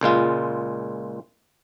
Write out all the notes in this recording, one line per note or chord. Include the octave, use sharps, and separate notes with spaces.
C#2 A#2 G#3 F4